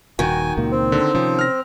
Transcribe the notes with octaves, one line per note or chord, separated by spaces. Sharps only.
D#1 D#3 F#4 G5 G#5
C#2 A#2 A#3
C4
D3
C3 F3 C#4
F6 A#6